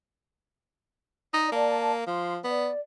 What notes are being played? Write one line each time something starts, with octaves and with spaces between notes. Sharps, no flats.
D#4 D5
A#3 D5 A5
F3 C6
B3 D5